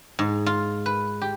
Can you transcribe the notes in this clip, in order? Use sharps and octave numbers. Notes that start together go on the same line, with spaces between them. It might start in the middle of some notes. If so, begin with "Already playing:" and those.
G#2
F4
B4
G4